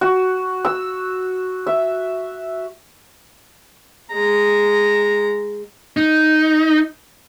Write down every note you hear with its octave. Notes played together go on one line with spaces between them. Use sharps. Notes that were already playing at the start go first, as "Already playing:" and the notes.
F#4
E6
E5
G#3 A#5
D#4